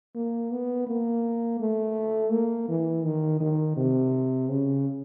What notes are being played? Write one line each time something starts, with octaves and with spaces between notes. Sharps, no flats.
A#3
B3
A#3
A3
A#3
E3
D#3
D#3
C3
C#3